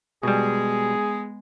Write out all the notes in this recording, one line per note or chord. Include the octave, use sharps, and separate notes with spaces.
B2 G3 G#3 B3 G#4